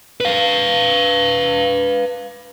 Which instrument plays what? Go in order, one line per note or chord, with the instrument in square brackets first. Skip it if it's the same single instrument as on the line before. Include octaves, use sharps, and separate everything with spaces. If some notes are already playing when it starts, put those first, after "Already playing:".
[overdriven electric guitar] B4 F5